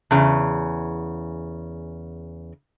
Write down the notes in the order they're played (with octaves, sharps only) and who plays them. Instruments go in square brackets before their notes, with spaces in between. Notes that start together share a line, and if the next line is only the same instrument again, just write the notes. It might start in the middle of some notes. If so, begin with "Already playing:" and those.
[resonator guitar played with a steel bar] E2 C#3